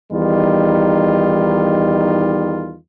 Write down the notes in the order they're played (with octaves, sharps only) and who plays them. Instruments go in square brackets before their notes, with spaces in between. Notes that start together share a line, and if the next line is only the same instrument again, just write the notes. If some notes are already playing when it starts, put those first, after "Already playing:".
[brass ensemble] E2 D#3 G3 D#4 F4